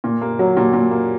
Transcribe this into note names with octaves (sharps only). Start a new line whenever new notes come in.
A#2
A#3
F#3
A#2
A#2
A#3